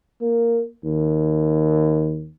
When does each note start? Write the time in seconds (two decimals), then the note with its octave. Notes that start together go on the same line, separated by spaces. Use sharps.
0.21 A#3
0.84 D#2